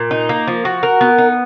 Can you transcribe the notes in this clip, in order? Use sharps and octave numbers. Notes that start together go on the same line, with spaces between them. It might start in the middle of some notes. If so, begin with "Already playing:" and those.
Already playing: A#2
D#4
A#3
F3
F#4
A#4
B3
D#4